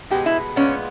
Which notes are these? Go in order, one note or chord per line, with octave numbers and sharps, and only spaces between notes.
B2 G#3 B3 G4
E4
A#2 G#3 B3 C#4